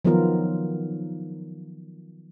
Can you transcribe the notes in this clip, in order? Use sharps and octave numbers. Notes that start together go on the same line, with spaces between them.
D#3 F3 F#3 B3 F4 A#4